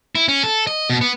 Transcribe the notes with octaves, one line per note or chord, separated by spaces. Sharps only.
E4
C#4
A4
D#5
B2
B3